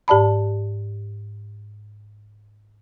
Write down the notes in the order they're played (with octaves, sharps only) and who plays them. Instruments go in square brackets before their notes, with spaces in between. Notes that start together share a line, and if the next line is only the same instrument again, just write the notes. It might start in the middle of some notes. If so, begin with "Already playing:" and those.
[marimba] G#2 G4 D5 A5 B5